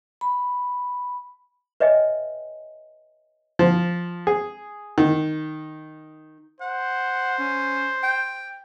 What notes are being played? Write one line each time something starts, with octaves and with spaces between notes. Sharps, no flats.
B5
B4 C#5 D#5 E5 G5 G#5
F3
G#4
D#3
C5 F#5
C#4
G5